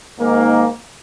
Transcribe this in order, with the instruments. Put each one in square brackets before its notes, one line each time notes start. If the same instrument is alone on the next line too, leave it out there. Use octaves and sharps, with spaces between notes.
[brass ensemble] G#2 D#3 A#3